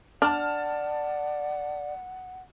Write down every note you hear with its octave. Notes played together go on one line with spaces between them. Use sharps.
D4 D5 F#5 A5 F6